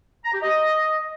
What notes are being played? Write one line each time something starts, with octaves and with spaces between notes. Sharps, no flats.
A#5
G4
D#5